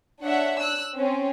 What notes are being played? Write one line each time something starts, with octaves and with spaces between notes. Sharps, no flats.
D4 C#5 E5 F#5
E6 F#6
C4 C#4